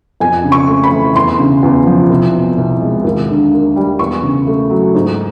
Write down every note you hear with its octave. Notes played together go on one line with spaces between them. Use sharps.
F2 G#5
C#3
C#6
A3
B5
E3
E2 C6
C#3
E2
F3
C2
B2
C2
G#3
D#2
D3
A#3
G3
E2 C#6
C#3
A3
F#3
G#2